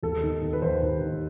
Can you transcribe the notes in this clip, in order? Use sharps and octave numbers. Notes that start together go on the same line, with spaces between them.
D#2 A4
D#3
D#3
B4
D#2 C5
D#2
D#3